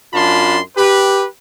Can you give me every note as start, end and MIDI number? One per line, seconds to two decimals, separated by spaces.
0.14 0.59 42
0.14 0.59 62
0.14 0.59 65
0.14 0.59 81
0.14 0.59 83
0.14 0.59 84
0.77 1.26 67
0.77 1.26 71